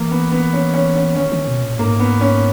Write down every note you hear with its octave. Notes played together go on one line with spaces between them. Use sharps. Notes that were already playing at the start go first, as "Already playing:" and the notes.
Already playing: E3 A#3
B3
B3
C#4
C#4
C#4
D#3 C#4
D#3
B2
A#2
G#2 A#3
B3
C#4